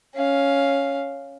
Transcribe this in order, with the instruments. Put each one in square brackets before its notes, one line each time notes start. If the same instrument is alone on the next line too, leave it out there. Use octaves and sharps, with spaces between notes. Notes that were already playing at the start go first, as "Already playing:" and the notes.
[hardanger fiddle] C#4 F5